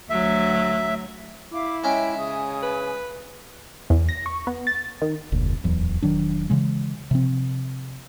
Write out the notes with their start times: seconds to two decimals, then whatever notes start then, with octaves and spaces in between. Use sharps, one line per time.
0.10 D2 F#3 E5
1.52 E4 E5 F5 D6
1.84 G#3 C#4 E5 G5
2.18 C#3 G#5 D#6
2.62 B4
3.90 E2
4.09 A#6
4.26 C#6
4.47 B3
4.67 A6
5.02 D#3
5.32 F1 D2 A#2
5.64 D1 E2 E3 F#3
6.02 E1 D#3 F#3 D4
6.50 C#3 E3 G#3
7.11 C3 F3 C4